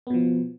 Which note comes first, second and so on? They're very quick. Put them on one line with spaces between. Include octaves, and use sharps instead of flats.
B3 B2 F3